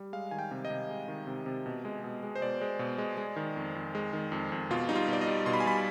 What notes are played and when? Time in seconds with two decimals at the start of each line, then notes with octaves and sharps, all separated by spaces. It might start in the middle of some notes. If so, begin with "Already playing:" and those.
Already playing: G3
0.13 G#3 F5
0.31 D#3 G#5
0.39 G5
0.51 C3
0.65 D#5
0.70 C3
0.90 G#3
1.08 D#3
1.27 C3
1.46 C3
1.66 B2
1.85 G#3
2.04 B2
2.23 G#3
2.35 C5
2.42 B2 D5
2.61 G#3
2.79 B2
2.98 G#3
3.17 G#3
3.36 D#3
3.56 F2
3.75 F2
3.95 G#3
4.13 D#3
4.32 F2
4.52 F2
4.70 B2 F4
4.89 G3 D#4
4.96 F4
5.08 B2
5.13 D5
5.21 D#5
5.27 G3
5.46 B2 C6
5.53 B5
5.60 G#5
5.66 G3 B5